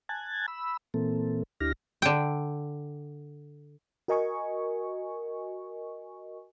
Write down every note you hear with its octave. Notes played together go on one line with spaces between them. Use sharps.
G#5 A5 F#6 G#6 A6
B5 E6
A#2 E3 A#3 C4 A4
D2 D4 E4 G4 F6 A#6
D3 G5
F#4 A#4 D#5 G#5 C#6